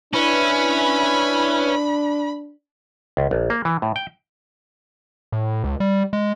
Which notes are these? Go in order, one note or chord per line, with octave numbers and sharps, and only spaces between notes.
C#4 D4 E4 B4 E5 B5
C#2
A#1
A#3
E3
A2
G5
A2
C#2
G3
G#3